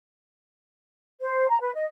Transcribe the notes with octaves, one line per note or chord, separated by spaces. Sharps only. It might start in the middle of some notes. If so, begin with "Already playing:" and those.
C5
A#5
B4
D#5